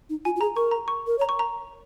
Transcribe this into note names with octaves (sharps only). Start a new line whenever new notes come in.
D#4
F4 G#5
F4
G#4 A#5
A#4 C#6
A#5
C#6
A#4
C#5
A#5
C#6
A#5